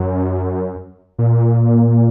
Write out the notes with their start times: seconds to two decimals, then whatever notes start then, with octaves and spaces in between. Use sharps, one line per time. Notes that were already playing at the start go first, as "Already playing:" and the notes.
Already playing: F#2
1.19 A#2